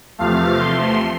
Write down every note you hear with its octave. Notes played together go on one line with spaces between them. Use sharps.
E2 C3 F3 A3 F5
C6